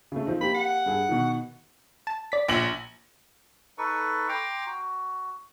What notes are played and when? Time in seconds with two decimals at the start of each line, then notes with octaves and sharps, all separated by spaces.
0.12 C#3 A3
0.26 F3 C4 D#4
0.41 A#3 G4 B5
0.54 F#5
0.86 G2 G#4
1.09 B2 D#3
2.07 A5
2.32 D5 B6
2.48 A#1 F#7
3.78 D#4 A4 B4 C#6
4.29 G5 A#5 C6 D6
4.66 F#4